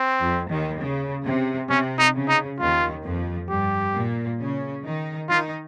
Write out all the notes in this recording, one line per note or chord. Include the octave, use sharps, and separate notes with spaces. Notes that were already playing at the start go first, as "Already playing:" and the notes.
Already playing: C4
F2 F3
D#2 D#3
C#3
C3
C3 C#4
D#4
C#3
D#4
D#2 D#3 F4
F2 F3
G2 G3 G4
A#2 A#3
C#3 C#4
D#3 D#4
D#3 D#4 F4